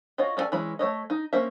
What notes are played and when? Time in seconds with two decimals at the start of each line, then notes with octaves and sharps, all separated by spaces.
0.18 F4 F#4 C#5 D#5
0.37 C#4 D4 A4 D5 G#5
0.52 E3 G#3 C#4 B5
0.79 A3 C#5 D#5
1.10 D#4
1.33 A#3 C#4 C5 E5